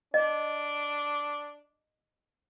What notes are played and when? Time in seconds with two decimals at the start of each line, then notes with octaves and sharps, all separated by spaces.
0.14 D4 D#5